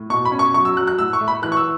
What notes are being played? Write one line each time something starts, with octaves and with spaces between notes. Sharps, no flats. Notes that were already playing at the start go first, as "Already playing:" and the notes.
Already playing: A2
B2 C#6
B5
C#4
C#6
F#3 C#6
E6
F#3 F#6
F#6
A2 E6
C#6
A3
B5
E3 F#6
C#6
E6